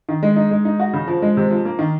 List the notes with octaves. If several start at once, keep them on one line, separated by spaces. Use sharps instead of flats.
D#3
G#3
D#4
G#3
D#4
F#4
C#3
F3
G#3
C3
F3
A#3
D#3